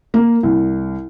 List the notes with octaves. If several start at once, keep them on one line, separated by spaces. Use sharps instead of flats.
A#3
C2